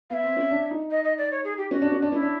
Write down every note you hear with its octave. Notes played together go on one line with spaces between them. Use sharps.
B3 E5 F5
C4
C#4
D4
D#4
D#5
D#5
D5
C#5
G#4
G4
C#4 F#4
D4
C#4
D4
C#4 E4
D4